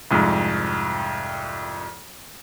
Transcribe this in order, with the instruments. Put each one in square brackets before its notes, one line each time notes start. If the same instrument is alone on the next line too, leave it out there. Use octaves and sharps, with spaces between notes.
[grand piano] C2 F2 G#2